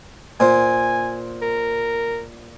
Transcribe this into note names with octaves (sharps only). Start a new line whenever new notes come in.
A#2 C5 G#5
A#4